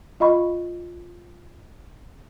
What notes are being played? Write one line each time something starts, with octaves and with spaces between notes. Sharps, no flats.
F4 D#5 F5 B5 C#6